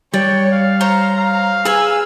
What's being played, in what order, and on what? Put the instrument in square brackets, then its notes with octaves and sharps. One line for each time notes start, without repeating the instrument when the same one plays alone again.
[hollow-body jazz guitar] G3 [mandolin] D4 [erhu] C#5 [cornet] G5
[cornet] F5
[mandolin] C5 C#5 [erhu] A#5
[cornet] F5
[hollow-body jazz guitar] G#4 [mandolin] B4 G#5 [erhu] E6